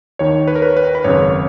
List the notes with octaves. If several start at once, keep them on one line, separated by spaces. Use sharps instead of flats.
D#2 D#3 C#5
B4
A#4
B4
B4
B4
G#1 F#2 C#3 C#5